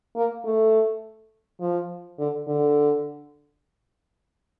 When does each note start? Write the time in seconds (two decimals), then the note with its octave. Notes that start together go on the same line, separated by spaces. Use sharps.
0.16 A#3
0.44 A3
1.61 F3
2.19 D3
2.47 D3